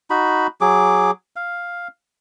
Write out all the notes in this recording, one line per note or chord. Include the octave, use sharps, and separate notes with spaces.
D#4 F#4 B5
F#3 G#4 D6
F5